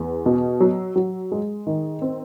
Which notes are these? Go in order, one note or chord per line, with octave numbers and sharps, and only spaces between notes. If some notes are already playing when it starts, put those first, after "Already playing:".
Already playing: E2
B2
F#3
F#3
G#3
D#3
C4